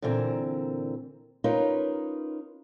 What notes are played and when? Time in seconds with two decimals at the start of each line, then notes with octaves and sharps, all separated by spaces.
0.02 A#2 D3 E3 C4 A#4
1.44 C#4 D#4 F4 A#4 B4